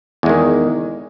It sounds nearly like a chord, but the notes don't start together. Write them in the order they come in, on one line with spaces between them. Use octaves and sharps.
E2 G#3 D#3